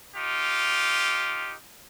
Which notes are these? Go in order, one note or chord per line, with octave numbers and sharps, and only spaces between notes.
D#4 F4 G4